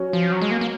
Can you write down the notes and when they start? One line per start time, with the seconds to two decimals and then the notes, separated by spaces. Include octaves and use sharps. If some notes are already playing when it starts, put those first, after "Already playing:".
Already playing: F#3 C#4 F#4 C#5
0.13 F3
0.32 F#3
0.41 G#3
0.51 A#3
0.61 A#3